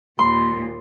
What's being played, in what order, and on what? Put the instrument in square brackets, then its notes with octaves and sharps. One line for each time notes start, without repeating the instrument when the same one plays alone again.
[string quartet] D#2 A#2 [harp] C6